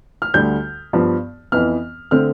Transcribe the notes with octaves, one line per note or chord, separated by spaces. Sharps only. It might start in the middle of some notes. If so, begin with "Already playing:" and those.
F6
D2 D3 G3 G6
G2 F3 B3
F2 E3 B3 F6
D3 A3 C4 F6